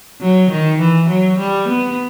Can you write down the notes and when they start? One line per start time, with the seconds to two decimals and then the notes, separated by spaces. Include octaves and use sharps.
0.21 F#3
0.50 D#3
0.80 E3
1.09 F#3
1.39 G3
1.68 B3